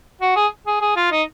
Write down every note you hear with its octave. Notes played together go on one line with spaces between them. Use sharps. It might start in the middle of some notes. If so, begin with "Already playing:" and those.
F#4
G#4
G#4
G#4
F4
D#4